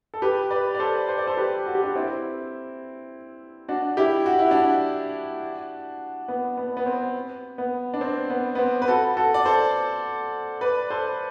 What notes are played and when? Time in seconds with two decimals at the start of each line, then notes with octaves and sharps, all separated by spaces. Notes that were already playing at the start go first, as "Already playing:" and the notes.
0.14 A4
0.22 G4 B4
0.51 B4 D5
0.75 D5
0.80 A4 C5
1.09 C5
1.18 D5
1.27 A4 C5
1.37 G4 B4
1.66 F#4
1.75 G4
1.83 D4 F#4
1.95 C4 E4
3.68 D4 F#4
3.97 E4 G4
4.26 F#4
4.39 E4
4.51 D4 F#4
6.28 B3
6.57 B3
6.77 B3
6.86 C4
7.58 B3
7.94 D4
8.01 C4
8.30 B3
8.55 B3
8.59 C4
8.82 B4
8.88 F#4 A4
9.17 F#4 A4
9.34 D5
9.45 A4 C5
10.61 B4 D5
10.90 A4 C5